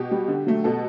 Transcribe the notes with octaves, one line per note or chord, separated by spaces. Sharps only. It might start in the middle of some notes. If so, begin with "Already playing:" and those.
Already playing: B2 G4
G3
D3
F#3 A3
B2 A4